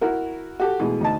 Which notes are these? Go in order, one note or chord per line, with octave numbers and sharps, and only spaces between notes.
E4 F#4 A#4
F#4 G4 A4
B2 E3 G#3 A3
D2 D#4 A5